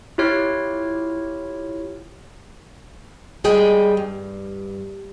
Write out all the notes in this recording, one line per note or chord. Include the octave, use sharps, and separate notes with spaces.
E4 F4 G4 C#5 F6
G3 G#4 D#5 G5
G2